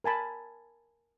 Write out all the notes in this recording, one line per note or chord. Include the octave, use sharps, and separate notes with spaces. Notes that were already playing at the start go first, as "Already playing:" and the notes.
A#4 G#5 A5 B5